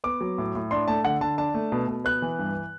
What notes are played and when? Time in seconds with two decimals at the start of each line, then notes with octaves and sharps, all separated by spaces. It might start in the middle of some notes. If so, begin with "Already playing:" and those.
0.04 B3 D6
0.21 F#3
0.38 A2
0.55 A2
0.71 D4 C6
0.88 A3 A5
1.04 D3 F#5
1.21 D3 A5
1.38 D4 A5
1.54 A3
1.72 B2
1.88 B2
2.04 B3 F#6
2.22 E3
2.39 G2